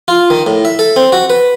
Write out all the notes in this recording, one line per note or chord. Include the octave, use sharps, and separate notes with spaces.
F4
D#3
A2
E5
A4
C4
F#4
B4